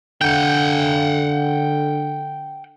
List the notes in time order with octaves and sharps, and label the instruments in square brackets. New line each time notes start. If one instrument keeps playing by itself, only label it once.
[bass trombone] D3 [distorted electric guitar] F#5 G5